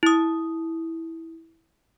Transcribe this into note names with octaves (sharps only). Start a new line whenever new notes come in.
E4 D#6